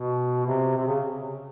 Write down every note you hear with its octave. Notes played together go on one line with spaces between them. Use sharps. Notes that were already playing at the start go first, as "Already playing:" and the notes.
Already playing: B2
C3
C3
C#3